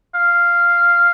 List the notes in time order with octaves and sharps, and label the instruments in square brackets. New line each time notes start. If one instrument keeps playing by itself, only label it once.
[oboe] F5